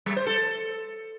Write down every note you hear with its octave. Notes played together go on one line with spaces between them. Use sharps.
G3
C5
A4